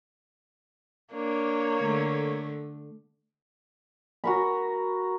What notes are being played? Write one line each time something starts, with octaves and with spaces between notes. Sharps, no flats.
A#3 D4 C#5
D3 A3
F#4 A#4 B5